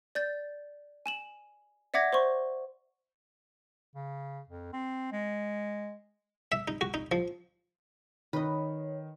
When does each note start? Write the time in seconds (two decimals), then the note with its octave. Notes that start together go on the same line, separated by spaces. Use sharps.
0.15 D5 G6 A6
1.06 G#5 E7 F#7
1.94 D5 E5 F#5 D6 G#6 A#6
2.13 C5 C6 C#6
3.95 C#3
4.49 F2
4.73 C4
5.12 G#3
6.52 E5
6.68 D#4
6.81 F#4
6.94 D#4
7.12 F3
8.33 D#3 B4 C#5 D#5